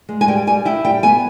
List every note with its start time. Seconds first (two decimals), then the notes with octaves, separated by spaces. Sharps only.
0.09 G#3
0.21 G#5
0.28 G3 G5
0.47 G3 G#5
0.65 E4 G5
0.85 G3 G5
1.03 B3 G#5